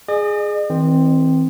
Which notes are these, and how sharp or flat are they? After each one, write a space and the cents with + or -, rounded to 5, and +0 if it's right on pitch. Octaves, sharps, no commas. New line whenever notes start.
G#4 +0 D#5 -45
E3 -45 C4 +0